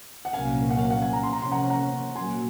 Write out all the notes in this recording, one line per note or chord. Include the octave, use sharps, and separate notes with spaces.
F#5
C2 A#2 F#3 A#3 C#4 F5 G#5
F#5
F5
F#5
F5 G#5
A#5
C3 F3 A#3 C#4 C6
A#5
C6
F#5 A#5
F#5 A#5
A#2 F#3 A#3 G#5 C6